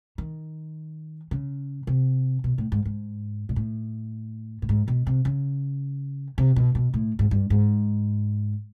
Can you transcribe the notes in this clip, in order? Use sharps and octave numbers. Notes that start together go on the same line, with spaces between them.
D#3
C#3
C3
B2
A2
G#2
G#2
A#2
A2
A2
G#2
B2
C3
C#3
C3
B2
B2
A2
G#2
G2
G#2